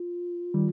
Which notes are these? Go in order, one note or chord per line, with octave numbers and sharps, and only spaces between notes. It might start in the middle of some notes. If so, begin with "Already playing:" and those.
Already playing: F4
D#3 G3